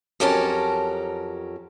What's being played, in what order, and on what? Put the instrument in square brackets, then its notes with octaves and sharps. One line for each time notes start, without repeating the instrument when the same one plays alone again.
[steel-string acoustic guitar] F2 F#3 C#4 G4 A#4 A5